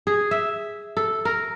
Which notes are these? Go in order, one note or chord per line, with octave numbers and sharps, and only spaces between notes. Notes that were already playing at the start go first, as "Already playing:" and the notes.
G#4
E5
A4
A#4